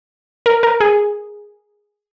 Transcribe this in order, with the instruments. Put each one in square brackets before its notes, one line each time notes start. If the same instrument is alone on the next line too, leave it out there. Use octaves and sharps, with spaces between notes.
[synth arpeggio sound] A#4
A#4
G#4